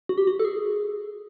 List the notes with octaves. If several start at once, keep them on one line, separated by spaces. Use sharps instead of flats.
F#4
G4
F#4
A4
G#4